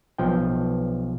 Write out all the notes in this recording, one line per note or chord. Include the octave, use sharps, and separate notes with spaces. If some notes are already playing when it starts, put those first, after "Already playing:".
B1 F3 G5